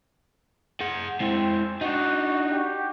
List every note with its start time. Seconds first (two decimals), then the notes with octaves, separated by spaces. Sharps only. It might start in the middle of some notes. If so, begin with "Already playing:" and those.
0.81 G#4 F#5
1.20 G#3 C4 E4
1.81 D4 D#4 F#4
2.51 F#4 G4